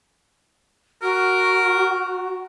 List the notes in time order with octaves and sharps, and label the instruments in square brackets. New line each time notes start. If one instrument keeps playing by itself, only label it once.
[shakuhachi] F#4 [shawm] A#4